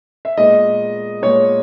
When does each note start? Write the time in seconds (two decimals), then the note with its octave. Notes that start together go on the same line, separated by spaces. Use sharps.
0.25 E5
0.37 A#2 G#3 B3 D#5
1.22 A#2 G#3 B3 C#5